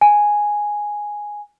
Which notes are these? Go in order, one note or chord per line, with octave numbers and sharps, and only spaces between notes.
G#5